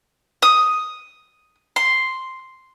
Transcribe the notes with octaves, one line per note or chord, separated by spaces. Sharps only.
D#6
C6